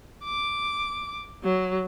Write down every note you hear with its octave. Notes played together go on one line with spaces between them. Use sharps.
D6
F#3